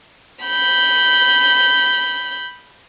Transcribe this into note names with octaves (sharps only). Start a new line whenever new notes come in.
B5 G6